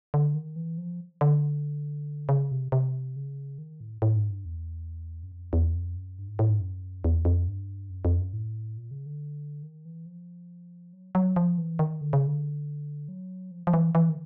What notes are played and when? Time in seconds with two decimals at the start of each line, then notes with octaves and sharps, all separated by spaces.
0.14 D3
0.35 D#3
0.56 E3
0.78 F3
1.21 D3
2.29 C#3
2.52 C3
2.72 C3
3.16 C#3
3.58 D#3
3.80 A2
4.02 A2
4.16 G#2
4.31 G2
4.45 E2
5.23 F#2
5.32 F2
5.53 E2
5.75 F2
5.96 F#2
6.19 G2
6.28 G#2
6.39 A2
6.50 G#2
6.60 F#2
7.04 E2
7.25 F2
7.48 G2
7.90 F#2
8.05 F2
8.19 F#2
8.33 A2
8.77 A#2
8.91 C#3
9.06 D3
9.63 D#3
9.85 E3
10.06 F3
10.93 F#3
11.15 F#3
11.36 F3
11.58 E3
11.79 D#3
12.01 D3
12.13 C#3
12.27 D3
13.08 F#3
13.51 F3
13.67 F3
13.74 E3
13.95 E3
14.09 D#3